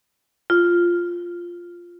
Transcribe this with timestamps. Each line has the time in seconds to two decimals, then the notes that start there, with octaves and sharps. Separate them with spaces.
0.50 F4